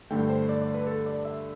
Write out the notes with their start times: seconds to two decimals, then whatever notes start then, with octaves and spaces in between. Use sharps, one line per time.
0.11 G2 D3 A3 G5
0.30 C5
0.49 D5
0.62 D5
0.74 B4
0.87 A4
1.06 D5
1.25 E5